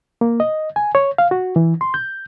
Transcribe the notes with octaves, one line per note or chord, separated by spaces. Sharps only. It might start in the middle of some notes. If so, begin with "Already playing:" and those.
A#3
D#5
G#5
C#5
F5
F#4
E3
C6
G6